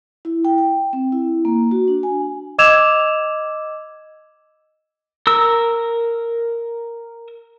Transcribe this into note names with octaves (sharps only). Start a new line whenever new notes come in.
E4
G5
G5
C4
E4
A#3
F#4
D4
G#5
D#5 D6 E6 G#6 E7 F7
A#4 E6